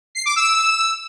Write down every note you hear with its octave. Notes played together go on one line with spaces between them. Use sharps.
C7
D6
E6